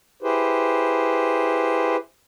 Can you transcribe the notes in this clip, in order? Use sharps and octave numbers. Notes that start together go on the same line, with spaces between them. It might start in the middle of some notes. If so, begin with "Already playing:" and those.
E4 G4 G#4 B4 C5